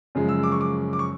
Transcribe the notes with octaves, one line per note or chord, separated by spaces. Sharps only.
F#2 C#3 F3 G#3
E6
D6
C#6
D6
D6
C#6